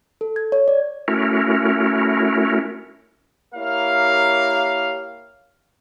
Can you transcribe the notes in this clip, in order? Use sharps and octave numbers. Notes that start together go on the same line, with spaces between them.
A4
G#6
C#5
D5
A3 C#4 E4 F#4 A#4
A#3 E4 G4 A#4 C#5 F5